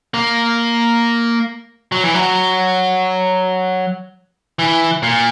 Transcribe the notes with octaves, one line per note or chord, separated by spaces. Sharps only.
A#3
F#3
E3
F#3
E3
A#2